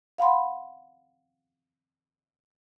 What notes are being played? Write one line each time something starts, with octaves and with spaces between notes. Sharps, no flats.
F5 F#5 B5 C6